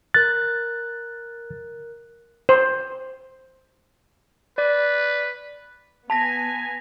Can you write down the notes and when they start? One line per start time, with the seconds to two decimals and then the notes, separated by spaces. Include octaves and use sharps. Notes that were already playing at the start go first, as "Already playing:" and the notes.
0.14 A#4 F#6 A6
2.49 C5
4.58 B4 D5
6.10 B3 G#5 A5 A#6 B6 F7